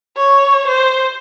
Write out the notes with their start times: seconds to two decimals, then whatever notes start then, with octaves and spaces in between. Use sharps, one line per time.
0.17 C#5
0.68 C5